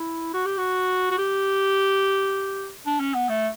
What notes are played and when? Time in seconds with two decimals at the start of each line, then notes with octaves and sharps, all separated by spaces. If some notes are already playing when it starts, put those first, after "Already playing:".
Already playing: E4
0.34 F#4
0.46 G4
0.58 F#4
1.11 F#4
1.18 G4
2.86 D4
3.00 C#4
3.15 B3
3.29 A3